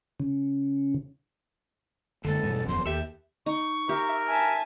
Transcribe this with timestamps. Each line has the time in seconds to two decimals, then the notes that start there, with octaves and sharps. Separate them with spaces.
0.20 C#3
2.25 F#1 D3 G#3 A4
2.43 E2 G2 B2 G3
2.67 D#1 F#2 F3 C6
2.86 D#2 G4 A4 E5
3.46 D#4 C#6
3.89 G4 A#4 E5
4.28 E5 G#5 A5